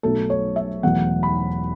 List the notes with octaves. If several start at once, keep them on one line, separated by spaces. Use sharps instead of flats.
B1 B2 F#3 A3 A4
C#5
E5
E1 E2 B2 F#3 A3 F#5
B5